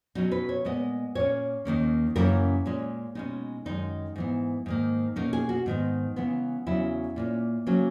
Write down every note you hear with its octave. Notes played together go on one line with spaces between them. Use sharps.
B2 F#3 C#4 D#4
B4
C#5
A#2 G#3 B3 D#5
A#2 A#3 C#4 C#5
D#2 D#3 A#3 C#4
F#2 C#3 E3 A#3 C#4 A#4
A#2 G#3 C#4
B2 G#3 C#4 D#4
F#2 D#3 G#3 D#4
G#2 E3 B3
G#2 D#3 A#3
B2 A#3 C#4 D#4
G#4
F#4
G#2 D#3 G#3 B3
C#3 E3 G#3 B3
E2 C#3 F#3 B3 E4
A#2 A#3 C#4
C#3 F#3 A#3 C#4